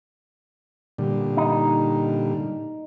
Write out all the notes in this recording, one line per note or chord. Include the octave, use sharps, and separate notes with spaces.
A#2 D3 G3
D#4